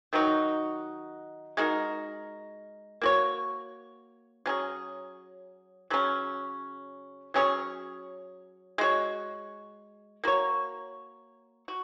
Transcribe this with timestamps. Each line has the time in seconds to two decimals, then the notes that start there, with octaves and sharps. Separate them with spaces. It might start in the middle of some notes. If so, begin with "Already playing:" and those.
0.13 D#3 F#3 D#4 F#4
1.57 G#3 D#4 F#4 A#4
3.01 A#3 F#4 C#5
4.46 F#3 C#4 G#4
5.90 C#3 F#3 C#4
7.34 F#3 C#4 G#4 C#5
8.78 G#3 F#4 C#5
10.24 A#3 F#4 C#5
11.68 F#4